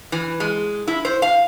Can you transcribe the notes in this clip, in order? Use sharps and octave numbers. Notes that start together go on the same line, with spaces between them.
E3
G#3
E4
C5
F5